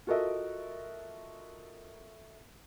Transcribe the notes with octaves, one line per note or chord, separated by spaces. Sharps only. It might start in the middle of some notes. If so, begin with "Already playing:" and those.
F4 F#4 A4 A#4 D#5 E5